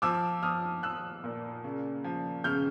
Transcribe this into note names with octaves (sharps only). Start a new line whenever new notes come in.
F3 D6 E6
F3 D#6 F6
F3 E6 F#6
A#2
C#3
F3
C#3 F6 G6